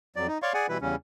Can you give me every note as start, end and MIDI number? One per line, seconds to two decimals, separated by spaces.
0.16 0.27 41
0.16 0.27 54
0.16 0.27 74
0.27 0.38 63
0.42 0.53 73
0.42 0.53 74
0.42 0.53 77
0.42 0.53 84
0.42 0.53 85
0.54 0.67 68
0.54 0.67 74
0.54 0.67 78
0.54 0.67 80
0.69 0.78 47
0.69 0.78 52
0.69 0.78 55
0.69 0.78 64
0.69 0.78 71
0.81 0.96 40
0.81 0.96 49
0.81 0.96 55
0.81 0.96 61